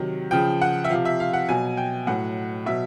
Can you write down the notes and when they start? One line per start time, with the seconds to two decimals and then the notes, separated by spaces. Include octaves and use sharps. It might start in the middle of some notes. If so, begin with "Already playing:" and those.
Already playing: C3 D#3 F#3
0.31 C#3 F3 G5
0.61 F#5
0.84 E5
0.90 C3 F3 F5
1.05 E5
1.20 F5
1.33 F#5
1.49 B2 F#3 G#5
1.77 G5
2.07 A2 F#3 F#5
2.66 B2 F#3 E5